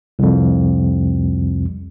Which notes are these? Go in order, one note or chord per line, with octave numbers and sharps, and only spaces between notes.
C2 F2